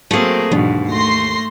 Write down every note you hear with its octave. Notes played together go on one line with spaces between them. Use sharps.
F#3 A3 A#3 C4 G#4
D#2 G#2 B2 E3 F#3 D4
A3 C6 A#6 C7